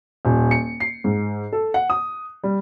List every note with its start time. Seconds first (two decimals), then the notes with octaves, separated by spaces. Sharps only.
0.25 D#1
0.51 C#7
0.80 C7
1.04 G#2
1.53 A4
1.74 F#5
1.90 D#6
2.44 G3